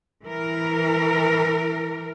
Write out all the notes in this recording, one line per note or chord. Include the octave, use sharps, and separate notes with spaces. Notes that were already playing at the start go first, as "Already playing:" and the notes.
E3 A#4